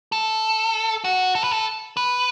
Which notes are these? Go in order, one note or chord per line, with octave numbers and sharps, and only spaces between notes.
A4
F#4
A4
B4
A4
B4